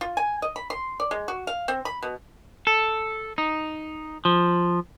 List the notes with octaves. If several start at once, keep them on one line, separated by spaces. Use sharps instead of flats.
F4
G#5
D#5
B5
C6
D5
G#3
F#4
F5
C4
B5
B2
A4
D#4
F3